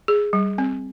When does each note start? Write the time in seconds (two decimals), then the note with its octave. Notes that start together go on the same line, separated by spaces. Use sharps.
0.08 G#4
0.33 G3
0.58 C4